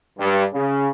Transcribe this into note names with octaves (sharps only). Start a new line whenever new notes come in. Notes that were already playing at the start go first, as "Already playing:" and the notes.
G2
C#3